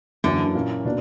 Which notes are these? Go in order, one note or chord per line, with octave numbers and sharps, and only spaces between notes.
F#2 D3 E3 A#3 C#4 E4
A#2 A#3 C#4 E4
B2 A#3 D4